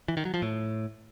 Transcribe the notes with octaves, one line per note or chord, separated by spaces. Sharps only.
E3
D#3
F#3
F3
A2